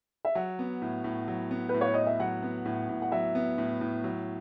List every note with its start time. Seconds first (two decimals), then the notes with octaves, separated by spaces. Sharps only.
0.25 E5
0.35 F#3 F#5
0.59 B3
0.82 A2
1.04 A2
1.28 F#3
1.51 B3
1.69 B4
1.74 A2
1.81 C#5
1.94 A2 D#5
2.06 E5
2.20 F#3 F#5
2.43 B3
2.65 A2
2.89 A2
3.02 F#5
3.12 F#3 E5
3.35 B3
3.58 A2
3.81 A2
4.04 F#3